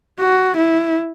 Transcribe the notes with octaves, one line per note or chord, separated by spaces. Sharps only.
F#4
E4